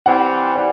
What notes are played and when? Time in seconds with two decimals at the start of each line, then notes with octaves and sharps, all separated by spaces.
0.06 E3 G3 C4 F#5
0.56 E3 G3 D5